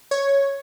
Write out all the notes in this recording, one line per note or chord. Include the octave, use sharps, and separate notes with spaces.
C#5